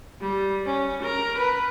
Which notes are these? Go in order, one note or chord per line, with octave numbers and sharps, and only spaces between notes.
G3
C#4
A#4
B4